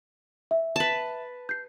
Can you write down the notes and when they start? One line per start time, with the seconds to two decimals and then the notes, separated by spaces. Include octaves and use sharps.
0.51 E5
0.76 B4 A5
1.49 G6 C7